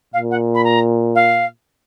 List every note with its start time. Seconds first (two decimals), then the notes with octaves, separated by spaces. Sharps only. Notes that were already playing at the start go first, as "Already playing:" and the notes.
0.13 A#2 F5
0.31 F#5
0.54 B5
0.64 A#5
1.15 F5